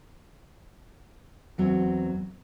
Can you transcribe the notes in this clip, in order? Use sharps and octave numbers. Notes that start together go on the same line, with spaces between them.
E2 F#3 C4